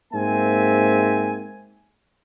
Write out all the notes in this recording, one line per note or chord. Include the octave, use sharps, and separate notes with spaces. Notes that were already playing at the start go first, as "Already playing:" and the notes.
G#2 A#3 C4 E5 G#5